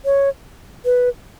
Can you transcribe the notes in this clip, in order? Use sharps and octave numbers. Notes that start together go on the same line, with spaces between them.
C#5
B4